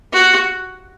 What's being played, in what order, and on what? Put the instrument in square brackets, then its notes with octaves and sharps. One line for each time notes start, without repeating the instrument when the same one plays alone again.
[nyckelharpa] F#4